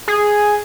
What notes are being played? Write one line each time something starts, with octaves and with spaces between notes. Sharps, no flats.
G#4